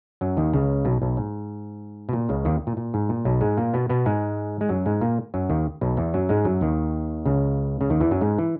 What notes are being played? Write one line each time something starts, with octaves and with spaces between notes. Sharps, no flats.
F#2 F#3
D#2 D#3
C#2 C#3
B1 B2
B1 B2
G#2
B2
A#2
C#2 C#3
D#2 D#3
A#2
A#2
G#2
A#2
B1 B2
G#2 G#3
A#2 A#3
B2 B3
B2 B3
G#2 G#3
G#3
F#2 F#3
G#2 G#3
A#2 A#3
F#2 F#3
D#2 D#3
B1 B2
E2 E3
F#2 F#3
G#2 G#3
F#2 F#3
D#2 D#3
C#2 C#3
C#3
D#2 D#3
E2 E3
F#2 F#3
G#2 G#3
E3